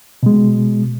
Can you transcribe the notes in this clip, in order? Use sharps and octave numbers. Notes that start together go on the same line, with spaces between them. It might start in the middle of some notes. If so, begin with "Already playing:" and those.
B2 G#3